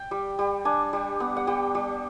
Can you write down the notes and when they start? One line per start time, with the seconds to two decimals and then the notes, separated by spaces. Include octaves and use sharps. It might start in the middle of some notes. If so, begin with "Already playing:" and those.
Already playing: G5
0.11 G3
0.39 G3
0.65 D4 G#5
0.93 G3
1.20 B3
1.37 F#5
1.47 G3 G5
1.75 G3